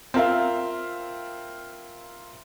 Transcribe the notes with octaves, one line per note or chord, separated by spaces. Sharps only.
C4 F4 A#4 E5 F5